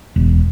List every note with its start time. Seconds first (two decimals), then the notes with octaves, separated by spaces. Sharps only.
0.16 E1